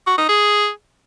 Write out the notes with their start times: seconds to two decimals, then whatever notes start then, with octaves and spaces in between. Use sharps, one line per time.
0.07 F#4
0.18 D#4
0.29 G#4